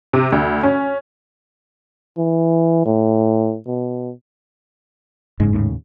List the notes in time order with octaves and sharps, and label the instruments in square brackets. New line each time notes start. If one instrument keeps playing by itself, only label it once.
[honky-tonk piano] C3
D2
C#4
[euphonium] E3
A2
B2
[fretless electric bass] F#1 C#3 G#3 [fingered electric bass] G#2
[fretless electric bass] D#2 A2 C#3